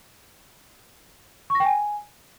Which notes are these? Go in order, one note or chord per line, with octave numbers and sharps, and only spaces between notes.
C#6
A#6
G5
G#5